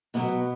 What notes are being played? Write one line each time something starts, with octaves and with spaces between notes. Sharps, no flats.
B2 F#3 B3